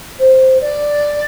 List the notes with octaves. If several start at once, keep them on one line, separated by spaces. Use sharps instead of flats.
C5
D5